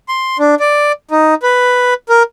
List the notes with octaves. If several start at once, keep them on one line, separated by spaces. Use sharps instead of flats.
C6
D4
D5
D#4
B4
A#4